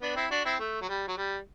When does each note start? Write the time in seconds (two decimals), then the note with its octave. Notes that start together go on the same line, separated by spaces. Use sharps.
0.02 B3 D4
0.16 C4 E4
0.31 D4 F#4
0.45 C4 E4
0.59 A3
0.81 F#3
0.89 G3
1.08 F#3
1.17 G3